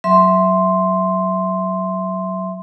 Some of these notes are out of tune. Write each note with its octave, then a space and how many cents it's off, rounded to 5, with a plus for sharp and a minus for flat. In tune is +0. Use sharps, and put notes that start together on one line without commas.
F#3 +10 E5 +0 C6 +0